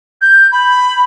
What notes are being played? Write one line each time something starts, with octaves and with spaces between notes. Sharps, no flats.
G6
B5